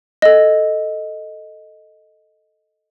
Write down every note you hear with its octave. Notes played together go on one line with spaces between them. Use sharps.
A4 D#5